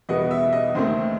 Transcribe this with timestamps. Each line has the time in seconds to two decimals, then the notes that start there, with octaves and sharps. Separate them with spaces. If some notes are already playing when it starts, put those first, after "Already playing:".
0.09 E2 B2 G3 B3 D#5
0.31 E5
0.53 D#5
0.75 D#2 D#3 A3 C4 C5